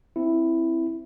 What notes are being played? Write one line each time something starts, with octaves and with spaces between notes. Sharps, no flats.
C4 E4